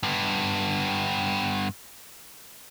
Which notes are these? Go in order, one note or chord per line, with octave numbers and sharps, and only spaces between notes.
G2 B3